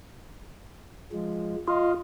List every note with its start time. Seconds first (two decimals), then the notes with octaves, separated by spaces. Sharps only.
1.12 F3 G#3
1.68 F4 D#5 F5